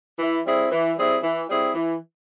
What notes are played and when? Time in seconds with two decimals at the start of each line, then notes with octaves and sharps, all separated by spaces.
0.19 E3
0.44 G3 C4 E4 G#4
0.71 E3
0.97 G3 C4 E4 G#4
1.22 E3
1.48 G3 C4 E4 G#4
1.75 E3